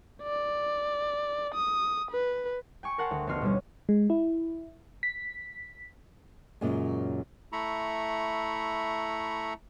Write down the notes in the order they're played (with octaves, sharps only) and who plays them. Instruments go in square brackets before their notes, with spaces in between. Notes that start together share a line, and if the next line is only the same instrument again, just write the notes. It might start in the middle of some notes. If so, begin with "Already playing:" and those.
[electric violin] D5
D#6
B4
[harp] G5 G#5 C#6
A#4 F#5 A5 C6
D2
F1 B3 F#4 C6 F6
B2 G3 C#4
[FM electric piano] G#3
E4
B6
[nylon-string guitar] F#2 A#2 C#3 F#3 G#3
[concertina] A3 E4 A#5 B5 C#6